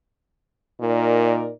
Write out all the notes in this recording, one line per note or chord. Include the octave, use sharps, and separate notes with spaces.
A#2 D#4 A#4 D5